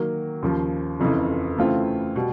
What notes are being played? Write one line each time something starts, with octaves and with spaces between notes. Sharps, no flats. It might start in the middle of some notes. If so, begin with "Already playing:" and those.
Already playing: D#3 F#3 A#3
D#2 C#3 F3
F1 F2 C#3 E3
C#3 E3 A3 C4 F4
B2 G3